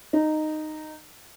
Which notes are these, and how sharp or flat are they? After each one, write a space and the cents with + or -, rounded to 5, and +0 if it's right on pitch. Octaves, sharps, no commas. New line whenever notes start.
D#4 -10